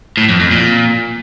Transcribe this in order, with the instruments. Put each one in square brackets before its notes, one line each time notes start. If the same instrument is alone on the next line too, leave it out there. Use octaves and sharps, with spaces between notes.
[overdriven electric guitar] A2
F2
F2
A#2